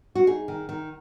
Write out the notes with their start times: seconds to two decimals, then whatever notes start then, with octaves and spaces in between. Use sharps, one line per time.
0.15 F#4
0.27 D#4 G#4
0.48 D#3
0.69 D#3